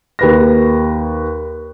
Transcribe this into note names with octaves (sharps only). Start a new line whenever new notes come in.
D#2 B4 A#6